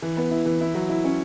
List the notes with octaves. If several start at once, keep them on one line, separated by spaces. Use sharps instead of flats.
E3
B3
E4
E3
E4
F#3
E4
C#4